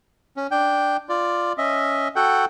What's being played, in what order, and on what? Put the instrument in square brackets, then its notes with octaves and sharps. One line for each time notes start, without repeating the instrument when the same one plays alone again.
[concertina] C#4
D4 G5
F4 D5
C#4 D#5 E5
F#4 A4 F#5 G5